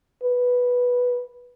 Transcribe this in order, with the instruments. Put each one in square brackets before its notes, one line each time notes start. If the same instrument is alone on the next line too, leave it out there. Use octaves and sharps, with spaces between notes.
[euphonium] B4